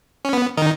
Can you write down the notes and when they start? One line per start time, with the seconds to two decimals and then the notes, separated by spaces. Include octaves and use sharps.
0.25 C#4
0.33 B3
0.57 D#3 D#4